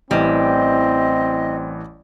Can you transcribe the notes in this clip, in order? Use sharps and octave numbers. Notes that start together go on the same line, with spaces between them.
A1 E3 G3 C4 D#5